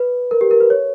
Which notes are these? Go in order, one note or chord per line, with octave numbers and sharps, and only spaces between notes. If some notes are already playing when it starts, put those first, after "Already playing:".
Already playing: B4
A#4
G4
A#4
B4
C#5